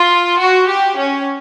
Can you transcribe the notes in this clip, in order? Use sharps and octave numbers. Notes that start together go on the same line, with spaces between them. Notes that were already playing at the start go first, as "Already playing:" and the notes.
Already playing: F4
F#4
G4
C#4